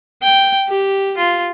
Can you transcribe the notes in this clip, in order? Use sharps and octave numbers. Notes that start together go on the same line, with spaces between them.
G5
G4
F4